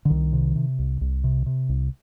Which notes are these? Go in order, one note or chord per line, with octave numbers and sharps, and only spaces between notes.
D3
C2 D#3
C3
C3
C2
C2
C3
C3
C2